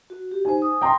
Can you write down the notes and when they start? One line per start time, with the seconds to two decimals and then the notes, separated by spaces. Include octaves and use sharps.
0.10 F#4
0.31 G4
0.45 D#4 C5 G#5
0.62 D#6
0.81 G5 A#5 C6